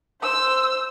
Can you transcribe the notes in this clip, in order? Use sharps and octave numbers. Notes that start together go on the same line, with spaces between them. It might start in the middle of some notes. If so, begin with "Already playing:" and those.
C5 E6